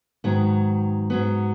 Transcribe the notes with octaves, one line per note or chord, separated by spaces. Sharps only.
G#2 D#3 F#3 B3
G#2 F#3 B3